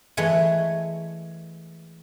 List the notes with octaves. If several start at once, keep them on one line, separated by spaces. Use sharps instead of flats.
E3 G#3 A3 C#5